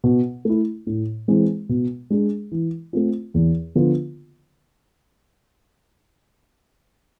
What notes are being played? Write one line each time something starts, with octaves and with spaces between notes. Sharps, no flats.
B2
A3 E4
A2
E3 G#3 C4
B2
G#3 D4 G#4
E3
A3 C4 F4
E2
D3 F3 B3 F4